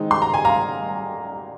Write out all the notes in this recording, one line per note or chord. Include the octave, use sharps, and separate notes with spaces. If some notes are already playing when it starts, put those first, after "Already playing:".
Already playing: D#3 G#3 C4 D#4
C6
A#5
G#5
F5 A#5